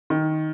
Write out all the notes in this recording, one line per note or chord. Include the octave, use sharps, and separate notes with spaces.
D#3